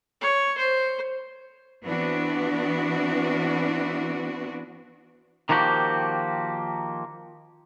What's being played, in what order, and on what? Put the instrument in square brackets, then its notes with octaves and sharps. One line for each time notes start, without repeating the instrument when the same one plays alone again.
[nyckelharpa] C#5
C5
[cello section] E3 B3 C4 D4 F#4
[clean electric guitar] D#3 F3 A#3 F#4 G4